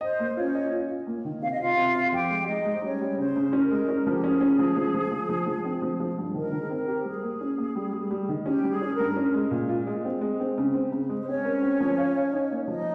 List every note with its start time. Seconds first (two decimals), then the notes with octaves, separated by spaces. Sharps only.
0.01 C5 D#5
0.19 A#3
0.36 C#4 F4 C#5
0.55 D#5
0.72 F4
0.89 F4
1.07 A#3
1.25 D#3
1.41 C3 F5
1.51 D#5
1.59 C3 F4 F5
1.77 C3
1.95 C3
2.12 F2 G4 G5
2.30 G#3
2.47 G#3 D#4 D#5
2.65 G#3
2.72 C5
2.83 G3 C#4 C#5
3.01 G3
3.18 C#3 C5
3.36 C#3
3.53 C#4 A#4
3.71 G#3
3.88 C#4
4.06 F3
4.14 G4
4.23 C#4 G#4
4.41 C#4
4.59 F3
4.76 F3
4.94 F3
5.11 F3
5.29 F3
5.46 F3
5.65 C4
5.82 F3
6.00 F3
6.18 G2
6.34 D#3 A#4
6.52 D#3
6.60 G#4
6.70 C4 A#4
6.88 G4
7.04 G3 G#4
7.23 A#3
7.41 C#4
7.58 A#3
7.75 G3
7.92 G3
8.11 G3
8.29 D#3
8.46 C#4 G4
8.63 G3
8.69 G#4
8.81 C#4
8.92 A#4
8.99 G2
9.17 C#4
9.34 G#3
9.51 A#2
9.69 F4
9.87 G#3
10.05 C4
10.21 G#3
10.40 C4
10.58 C#3
10.74 C4
10.92 C#3
11.09 G#3
11.19 C5
11.27 C4 C#4 C#5
11.45 A#4
11.62 C4
11.80 F3
11.98 F5
12.15 F5
12.32 D#4
12.51 A#3
12.68 F3 D#4 D#5